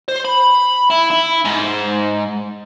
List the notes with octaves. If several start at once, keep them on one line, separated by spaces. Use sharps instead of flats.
C5
B5
E4
E4
G#2